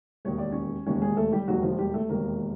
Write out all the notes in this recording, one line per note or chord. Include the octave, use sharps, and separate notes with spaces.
E1 D#2 D#3 C#5
D5
C#4 C#5
E1 D#2 D#3 C#4 C#5
G#3 G#4
A3 A4
G3 G4
E1 D#2 D#3 F#3 F#4
F3 F4
G3 G4
A3 A4
E1 D#2 D#3 A#3 A#4